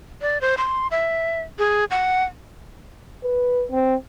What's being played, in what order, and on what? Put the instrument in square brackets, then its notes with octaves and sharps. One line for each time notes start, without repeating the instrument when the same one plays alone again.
[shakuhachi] D5
C5
C6
E5
G#4
F#5
[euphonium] B4
C4